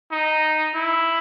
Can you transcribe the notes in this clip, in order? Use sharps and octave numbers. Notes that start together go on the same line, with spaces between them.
D#4
E4